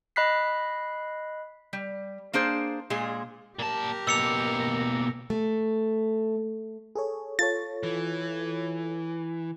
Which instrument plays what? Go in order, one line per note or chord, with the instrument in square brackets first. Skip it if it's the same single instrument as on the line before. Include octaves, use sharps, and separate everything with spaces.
[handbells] D#5 B5 F#6 B6 C7
[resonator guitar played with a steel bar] G3
A#3 D4 G#4 C5
A#2 G#3 G#4
[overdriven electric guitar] A#2 A5 [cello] G4 A#4
[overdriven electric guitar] B2 A#3 [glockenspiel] E6 C#7 F7
[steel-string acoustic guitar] A3
[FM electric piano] G#4 A4 C#5
[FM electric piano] F4 A4 C#5 [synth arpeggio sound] A6
[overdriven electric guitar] E3